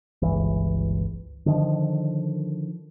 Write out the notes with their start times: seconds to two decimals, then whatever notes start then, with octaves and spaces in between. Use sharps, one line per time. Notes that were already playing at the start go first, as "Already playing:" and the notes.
0.22 G1 C#2 E3
1.46 D3 D#3 F3